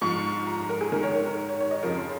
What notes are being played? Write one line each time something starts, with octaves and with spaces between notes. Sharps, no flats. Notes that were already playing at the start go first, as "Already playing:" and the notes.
G#2 F3 C#6
A#5
A#5
A#4
G#4
G#2 D#3 A#4
C#5
A#4
A#4
C#5
C#5
D#5
F2 C#3 F3 A#4